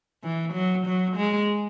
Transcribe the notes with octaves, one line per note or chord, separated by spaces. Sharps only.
E3
F#3
F#3
G#3